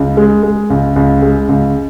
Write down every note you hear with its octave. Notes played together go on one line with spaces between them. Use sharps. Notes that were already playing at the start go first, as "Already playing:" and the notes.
Already playing: C#2
G#3
G#3
C#2
C#2
G#3
C#2